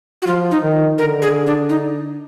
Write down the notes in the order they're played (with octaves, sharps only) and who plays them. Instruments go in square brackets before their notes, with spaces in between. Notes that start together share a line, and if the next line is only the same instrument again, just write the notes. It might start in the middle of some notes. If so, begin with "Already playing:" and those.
[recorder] F#4
[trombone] F3 [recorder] F4
[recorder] D#4
[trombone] D#3
[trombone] D3 [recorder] A#4
[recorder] G#4
D4
D#4